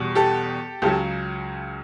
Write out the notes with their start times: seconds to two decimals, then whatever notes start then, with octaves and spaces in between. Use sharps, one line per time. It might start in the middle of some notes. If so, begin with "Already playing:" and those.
Already playing: E2 B2 G3
0.15 G4 A4
0.82 C#2 C#3 F#3 G4 A4